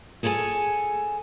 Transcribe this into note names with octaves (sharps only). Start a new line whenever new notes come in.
G#4 A4 C#5 G5 G#5